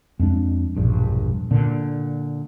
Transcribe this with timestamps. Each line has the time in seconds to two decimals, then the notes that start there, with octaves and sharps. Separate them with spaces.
0.19 F2 G#3 D4
0.75 E1 A#1 G2
1.51 A#2 D3